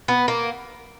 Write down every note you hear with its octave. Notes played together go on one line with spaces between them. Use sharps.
B3
A#3